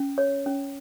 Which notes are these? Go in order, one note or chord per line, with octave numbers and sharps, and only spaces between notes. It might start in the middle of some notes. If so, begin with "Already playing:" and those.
Already playing: C#4
C#5
C#4